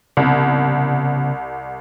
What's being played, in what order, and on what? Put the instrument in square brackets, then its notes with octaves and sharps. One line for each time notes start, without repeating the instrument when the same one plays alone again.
[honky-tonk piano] C2 [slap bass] C#3 B3